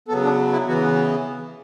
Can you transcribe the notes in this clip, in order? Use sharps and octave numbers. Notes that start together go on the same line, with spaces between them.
C#3 F#3 B3 A4
D4
E4
C#3 E3 B3 F#4